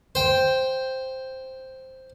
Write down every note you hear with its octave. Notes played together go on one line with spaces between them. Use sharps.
C5 G5